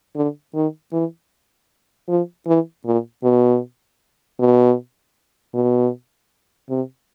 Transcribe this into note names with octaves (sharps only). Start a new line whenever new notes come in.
D3
D#3
E3
F3
E3
A#2
B2
B2
B2
C3